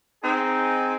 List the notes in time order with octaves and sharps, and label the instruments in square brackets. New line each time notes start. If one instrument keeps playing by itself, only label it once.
[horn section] C4 D#4 G#4